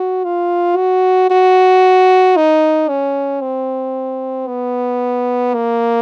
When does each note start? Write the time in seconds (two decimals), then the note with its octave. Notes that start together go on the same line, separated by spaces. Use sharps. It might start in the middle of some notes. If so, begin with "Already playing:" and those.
Already playing: F#4
0.24 F4
0.77 F#4
1.30 F#4
2.36 D#4
2.89 C#4
3.41 C4
4.48 B3
5.54 A#3